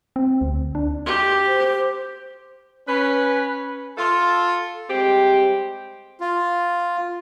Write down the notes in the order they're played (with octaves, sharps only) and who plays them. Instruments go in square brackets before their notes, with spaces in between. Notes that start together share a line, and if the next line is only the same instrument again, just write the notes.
[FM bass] C4
D2
D4
[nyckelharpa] G4
[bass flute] C5
[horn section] C#4 B4
[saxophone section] F4 A4
G3 G#3 C4 G4
[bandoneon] F4